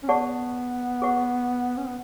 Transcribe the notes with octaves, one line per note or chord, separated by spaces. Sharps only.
C#4
B3 G#4 D5 F#5 A5 C#6
G#4 B4 F#5 C#6
C#4
B3